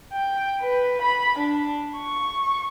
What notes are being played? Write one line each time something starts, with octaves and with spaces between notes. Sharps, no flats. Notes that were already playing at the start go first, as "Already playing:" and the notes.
G5
B4
B5
D4
C#6